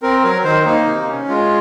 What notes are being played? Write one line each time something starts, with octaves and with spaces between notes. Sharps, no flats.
C4 A#4
F#3 A#4
D#3 C5
A#3 D#4
C3
C#4
G#3 F4